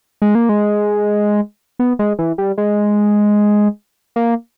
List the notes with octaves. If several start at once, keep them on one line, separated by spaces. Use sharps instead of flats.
G#3
A#3
G#3
B3
G#3
E3
G3
G#3
A#3